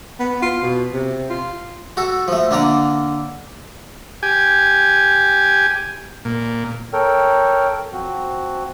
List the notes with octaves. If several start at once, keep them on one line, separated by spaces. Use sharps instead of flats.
B3
F4
B2
C3
F4
F#4 A4
F3 A3
D3 A#3 D4 D5 A#5
G4 G#5
A#2
A4 A#4 C#5 G5 F6
F3 C4 F#4